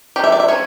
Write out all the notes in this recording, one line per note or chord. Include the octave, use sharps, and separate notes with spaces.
F3 C#4 G4
E5
D5
E5
F3 C#4 C#5